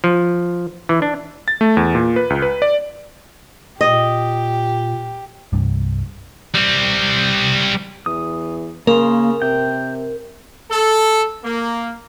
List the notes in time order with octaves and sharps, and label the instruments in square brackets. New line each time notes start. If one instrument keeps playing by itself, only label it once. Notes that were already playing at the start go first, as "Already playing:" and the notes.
[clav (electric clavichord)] F3
E3
D4
[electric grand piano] A6
A3
E2
A#2
B4
C#2
B4
D5
[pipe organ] A#2 [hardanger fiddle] G4 [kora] D#5
[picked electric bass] C2 G2
[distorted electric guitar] G3 C4
[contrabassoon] E2 [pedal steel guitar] D#6
[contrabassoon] C#3 [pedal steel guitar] A#3 C6 [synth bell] A#4
[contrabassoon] C3 [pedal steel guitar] G5
[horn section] A4
A#3